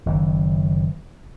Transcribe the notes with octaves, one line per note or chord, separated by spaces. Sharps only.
F#1 D#3 E3